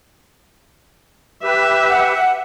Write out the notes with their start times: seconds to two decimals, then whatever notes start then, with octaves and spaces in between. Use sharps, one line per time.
1.43 G4 B4 E5
1.89 F#5